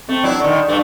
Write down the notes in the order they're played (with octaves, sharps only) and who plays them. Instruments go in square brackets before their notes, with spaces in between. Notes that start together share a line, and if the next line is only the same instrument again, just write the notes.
[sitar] A3 [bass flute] C4
[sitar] F#3 D4 E4
[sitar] D3 D#3 [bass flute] D5
[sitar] G2 A3